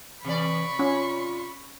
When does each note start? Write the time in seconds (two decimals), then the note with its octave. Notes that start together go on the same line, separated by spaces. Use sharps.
0.25 C3 E3 D5 B5 C#6
0.79 C#4 F4